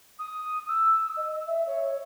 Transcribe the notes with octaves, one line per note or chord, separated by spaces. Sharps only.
D#6
E6
D#5
E5
C#5